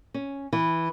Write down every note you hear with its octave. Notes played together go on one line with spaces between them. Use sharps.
C#4
E3